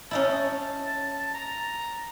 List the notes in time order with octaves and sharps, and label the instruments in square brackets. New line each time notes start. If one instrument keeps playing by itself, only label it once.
[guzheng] C#4 D#4 E4 [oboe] A5
[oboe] A#5